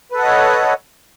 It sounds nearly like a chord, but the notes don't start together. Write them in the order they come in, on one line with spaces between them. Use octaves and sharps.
B4 A4 F#5 D#5 C#5